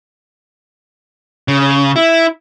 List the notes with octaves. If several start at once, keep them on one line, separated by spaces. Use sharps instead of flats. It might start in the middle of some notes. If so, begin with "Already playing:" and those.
C#3
E4